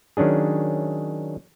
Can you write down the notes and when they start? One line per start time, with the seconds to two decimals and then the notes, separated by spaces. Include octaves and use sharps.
0.17 D#3 F#3 C#4 D4 G#4